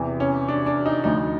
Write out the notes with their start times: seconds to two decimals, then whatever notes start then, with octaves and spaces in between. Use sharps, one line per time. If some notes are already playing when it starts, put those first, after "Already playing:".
Already playing: E2 C3 E3
0.20 C#4
0.48 D4
0.66 D4
0.86 D#4
1.04 D2 D3 F3 D#4